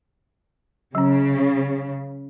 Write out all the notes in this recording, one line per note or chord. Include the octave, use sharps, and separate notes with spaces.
C#3 F#3 C#4